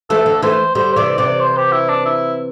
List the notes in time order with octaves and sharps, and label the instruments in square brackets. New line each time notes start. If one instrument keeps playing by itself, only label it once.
[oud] E3 A3 [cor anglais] A4
[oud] D3
[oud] E3 A3 [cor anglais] C5
[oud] D3 G3 [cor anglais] C5
[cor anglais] C5
[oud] C3 E3 [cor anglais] D5
[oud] C3 E3 [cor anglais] D5
[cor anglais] C5
G4
E4
D4
E4